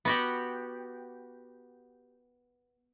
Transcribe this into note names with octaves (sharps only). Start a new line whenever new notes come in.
B3 F#4 G4